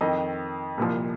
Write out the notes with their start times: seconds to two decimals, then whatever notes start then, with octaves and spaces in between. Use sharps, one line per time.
0.01 F2 D#3 D#5
0.78 C2 A#2 F3